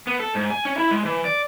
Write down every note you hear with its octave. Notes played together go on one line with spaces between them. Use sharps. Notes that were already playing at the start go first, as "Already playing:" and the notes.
B3
A4
G#2
G#5
C#4
E4
G#3
E3
D5